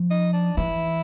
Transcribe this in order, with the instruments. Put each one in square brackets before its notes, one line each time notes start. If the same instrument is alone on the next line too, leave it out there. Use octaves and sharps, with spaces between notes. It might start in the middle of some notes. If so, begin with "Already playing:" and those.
Already playing: [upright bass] F3
[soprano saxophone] D#4
D4
[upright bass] E3 [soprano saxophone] E4